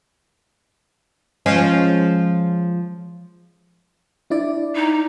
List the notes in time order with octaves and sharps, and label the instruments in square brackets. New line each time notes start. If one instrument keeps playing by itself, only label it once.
[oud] F3 G#3 C#4
[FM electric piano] D4 E4 D5
[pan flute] D#4